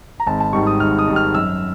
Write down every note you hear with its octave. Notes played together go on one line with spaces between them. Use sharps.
A#5
G#1 A5
A5
G#2 D#3 G3 C#6
D#6
G#1 F6
D#6
G#2 D#3 G3
F6
F#2 E6